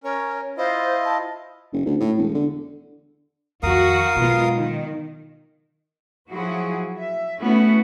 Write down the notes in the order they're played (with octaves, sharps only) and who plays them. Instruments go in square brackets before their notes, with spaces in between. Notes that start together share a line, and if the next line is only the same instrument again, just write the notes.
[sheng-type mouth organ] C#4 A#4 [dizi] C#5
[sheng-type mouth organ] E4 F4 D#5 [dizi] C5
[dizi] A5
[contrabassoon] F#1
D2
A2
E1
D3
[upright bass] F2 D#3 [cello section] F#4 [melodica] A#4 F5 D#6
[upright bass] B2 F#3 [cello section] G#3 B3 F4
[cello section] D#3
F3 F#3 E4 F#4 G#4
E5
A3 B3 C#4 E4 F#4